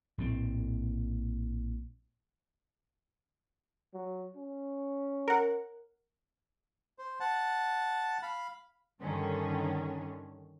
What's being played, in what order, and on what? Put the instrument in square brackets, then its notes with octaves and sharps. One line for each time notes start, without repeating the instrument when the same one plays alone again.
[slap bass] A#1 A2 C4
[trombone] F#3
C#4
[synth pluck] A#4 F#5
[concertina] C5
F#5 A5
F5 B5
[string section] G2 D3 D#3 C#4